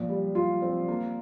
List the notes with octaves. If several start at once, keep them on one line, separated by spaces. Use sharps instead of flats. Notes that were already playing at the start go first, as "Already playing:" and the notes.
Already playing: A#2 F3
G3
F4
C4
A#3